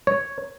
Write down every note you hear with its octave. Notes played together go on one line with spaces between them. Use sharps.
C#5